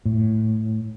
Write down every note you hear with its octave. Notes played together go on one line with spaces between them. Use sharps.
A2